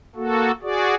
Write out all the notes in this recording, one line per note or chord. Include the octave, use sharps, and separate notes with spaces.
A#3 F#4 A4
F#4 G#4 D5